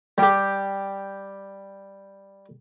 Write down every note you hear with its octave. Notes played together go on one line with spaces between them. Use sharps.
G3 G4